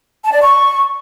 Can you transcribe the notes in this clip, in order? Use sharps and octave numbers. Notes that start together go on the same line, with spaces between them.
A5
D5
C#6